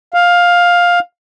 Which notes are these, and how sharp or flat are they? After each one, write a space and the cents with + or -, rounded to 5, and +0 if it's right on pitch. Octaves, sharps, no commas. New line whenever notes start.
F5 +10